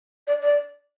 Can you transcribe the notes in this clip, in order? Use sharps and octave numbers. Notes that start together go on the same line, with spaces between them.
D5
D5